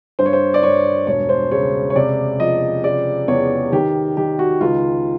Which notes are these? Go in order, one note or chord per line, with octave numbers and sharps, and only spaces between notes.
G2 C5
C#5
C5
D5
G2 C#5
E1 C#5
C5
C#3 C#5
C#5
C3 D5
F3 D#5
C#3 D5
E2 C#5
D#3 G4
D#3 G4
F#4
C#2 F4